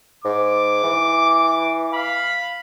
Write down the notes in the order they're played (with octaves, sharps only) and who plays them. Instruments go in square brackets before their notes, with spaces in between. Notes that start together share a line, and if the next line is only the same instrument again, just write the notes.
[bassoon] G#2 [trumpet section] D6
[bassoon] E3
[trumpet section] F5 B5